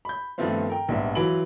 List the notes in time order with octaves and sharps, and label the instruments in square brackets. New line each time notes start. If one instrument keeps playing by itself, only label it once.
[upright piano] B5 G6
G2 D#3 F3 A3 B3 C4
A#4 G5
A#1 G#2 G3 B3 E5
E3 F#3 F4 B5 D7 F#7